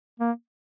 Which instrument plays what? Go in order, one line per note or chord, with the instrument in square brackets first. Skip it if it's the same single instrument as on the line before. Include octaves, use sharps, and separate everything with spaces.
[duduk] A#3